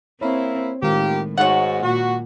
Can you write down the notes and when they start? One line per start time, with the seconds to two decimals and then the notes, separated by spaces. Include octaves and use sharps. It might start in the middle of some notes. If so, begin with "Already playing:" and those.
0.21 A#3 C4 E4 C#5
0.83 A2 D#3 G#3 A#3 F4 G4
1.38 G#2 F#4 C#5 F#5
1.83 A#2 F#4